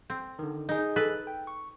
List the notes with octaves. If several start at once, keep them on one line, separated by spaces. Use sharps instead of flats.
C4
D3 D#3
D#4 G#4 D#5
A4 B4
G5
C#6